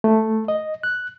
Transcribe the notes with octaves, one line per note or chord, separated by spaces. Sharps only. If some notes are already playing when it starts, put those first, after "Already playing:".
A3
D#5
F#6